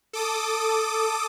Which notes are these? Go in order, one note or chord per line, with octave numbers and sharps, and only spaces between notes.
A4 D6 D#6